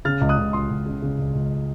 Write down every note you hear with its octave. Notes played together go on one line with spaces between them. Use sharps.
C#3 F6 A6
C#2
D#6 F#6
C#2
C#2 C6 D#6
C#2
C#3
C#3
C#2
C#2